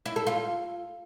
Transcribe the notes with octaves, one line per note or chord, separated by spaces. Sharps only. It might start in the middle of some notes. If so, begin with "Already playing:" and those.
E4
A4
F4